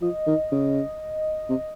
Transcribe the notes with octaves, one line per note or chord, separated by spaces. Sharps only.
F3 D#5
D#3
C#3
C3